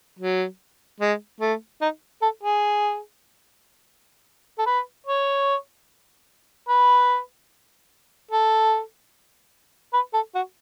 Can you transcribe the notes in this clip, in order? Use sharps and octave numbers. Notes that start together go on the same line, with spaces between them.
F#3
G#3
A3
D#4
A4
G#4
A4
B4
C#5
B4
A4
B4
A4
F#4